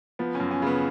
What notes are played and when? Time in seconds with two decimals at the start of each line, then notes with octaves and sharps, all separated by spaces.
0.19 F3 B3
0.35 F#2 C#4
0.51 C#4
0.62 C#3 B3